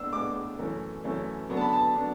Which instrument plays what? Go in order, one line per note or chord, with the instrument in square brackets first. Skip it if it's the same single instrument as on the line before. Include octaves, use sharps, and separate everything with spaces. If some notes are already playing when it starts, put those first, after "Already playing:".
Already playing: [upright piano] A2 G#3 B3 D4 E6
A2 G#3 B3 D4 D6
F#2 E3 A3 C#4
F#2 E3 A3 C#4
D3 F#3 B3 D4
A5
B5
A5
F#3 B3 D4